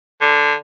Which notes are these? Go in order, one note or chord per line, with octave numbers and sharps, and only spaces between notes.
D3